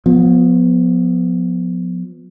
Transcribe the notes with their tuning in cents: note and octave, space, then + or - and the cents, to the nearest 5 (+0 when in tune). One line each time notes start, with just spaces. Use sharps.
F3 +35 B3 +0